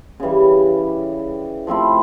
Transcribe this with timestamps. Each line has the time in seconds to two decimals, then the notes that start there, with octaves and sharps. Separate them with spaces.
0.20 C#3 E3 G3
1.67 F3 A3 C4 E4